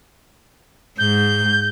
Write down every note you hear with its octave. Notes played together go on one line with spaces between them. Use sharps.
G#2 G6